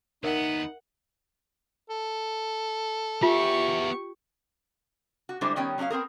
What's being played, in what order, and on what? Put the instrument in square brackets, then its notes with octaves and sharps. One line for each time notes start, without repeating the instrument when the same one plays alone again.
[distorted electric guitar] D#2 B3 [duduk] D#4 [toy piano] A#4 E5 [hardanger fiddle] F#5
[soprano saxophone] A4
[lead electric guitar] B3 E5 [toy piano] F4 [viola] G4 C#6
[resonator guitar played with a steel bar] F#4
D3 G3 G#3 D4 E4 C5
D#3 G3 B3 C#4 C#5 G5
F#3 C#4 D4 G#4 F5
B3 C4 G#4 A#4